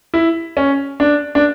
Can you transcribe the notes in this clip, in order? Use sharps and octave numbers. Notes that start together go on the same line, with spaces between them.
E4
C#4
D4
D4